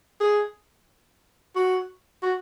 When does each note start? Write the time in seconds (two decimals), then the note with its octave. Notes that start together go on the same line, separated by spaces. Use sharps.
0.21 G#4
1.56 F#4
2.23 F#4